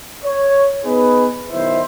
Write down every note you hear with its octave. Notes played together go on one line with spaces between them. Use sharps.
C#5
B3 D#4 G#4 B4
B1 D#3 E4 C5 E5